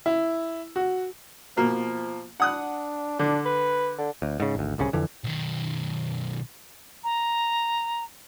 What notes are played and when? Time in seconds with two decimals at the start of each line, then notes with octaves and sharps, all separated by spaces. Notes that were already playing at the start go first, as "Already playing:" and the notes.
0.06 E4
0.76 F#4
1.57 B2 F3 A#3
2.40 D4 F#5 D#6 F#6
3.19 D3 D4
3.45 B4
3.98 D3
4.22 D2
4.40 G#2 C#3
4.55 G#1 D2
4.78 D1 C2 C#3 C#4
4.93 F2 D3 E3
5.24 B1 D#3
7.04 A#5